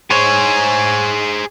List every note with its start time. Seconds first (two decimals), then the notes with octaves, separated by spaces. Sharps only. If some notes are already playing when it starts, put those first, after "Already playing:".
0.11 G#4 C5 C#5 G#5